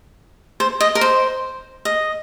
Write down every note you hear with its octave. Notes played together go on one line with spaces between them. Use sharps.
C5
D#5
A#4
C5
D#5